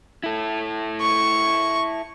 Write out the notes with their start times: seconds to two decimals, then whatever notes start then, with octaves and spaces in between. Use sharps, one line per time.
0.24 E4 A4
1.01 C#6